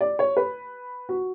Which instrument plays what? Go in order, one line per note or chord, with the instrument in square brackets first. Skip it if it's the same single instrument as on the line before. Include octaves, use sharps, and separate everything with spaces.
[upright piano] D5
C#5
B4
F#4